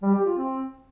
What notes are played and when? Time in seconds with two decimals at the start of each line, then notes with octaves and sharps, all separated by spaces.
0.03 G3
0.14 G4
0.26 F4
0.38 C4